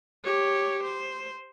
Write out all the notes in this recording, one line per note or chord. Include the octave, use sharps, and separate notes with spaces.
G4 C#5
C5